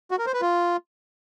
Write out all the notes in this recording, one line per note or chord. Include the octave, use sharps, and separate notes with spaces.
F#4
A#4
C5
B4
F4